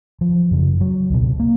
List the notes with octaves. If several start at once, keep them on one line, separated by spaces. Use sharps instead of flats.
F3
F#2 C#3
F#3
C#2 B2
A#3